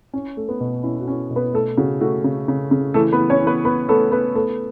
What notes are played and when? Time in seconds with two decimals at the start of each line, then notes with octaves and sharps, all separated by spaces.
0.13 C#4
0.37 A3
0.49 B3 B4
0.61 B2
0.83 C#4 E4
0.95 E4
1.01 F#4
1.08 C#4
1.30 B2
1.36 B3 B4
1.54 A3 A4
1.78 C#3 F#4
2.01 A3 F#4
2.24 C#3
2.48 C#3
2.71 C#3
2.94 E3 A3 A4
3.12 B3 B4
3.18 E3
3.30 C#4 C#5
3.41 E3
3.47 B3 B4
3.65 B3 B4
3.89 A3 B3 A4
4.12 B3 B4
4.35 A3 B3 A4